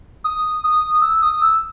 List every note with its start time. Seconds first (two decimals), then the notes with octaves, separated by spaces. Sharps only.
0.24 D#6
0.64 D#6
1.02 E6
1.22 D#6
1.42 E6